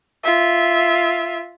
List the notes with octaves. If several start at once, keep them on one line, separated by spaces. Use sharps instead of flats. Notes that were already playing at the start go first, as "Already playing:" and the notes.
F4 E5